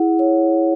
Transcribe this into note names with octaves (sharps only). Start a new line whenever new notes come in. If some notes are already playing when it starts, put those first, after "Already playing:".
Already playing: E4 G#4 F#5
C#5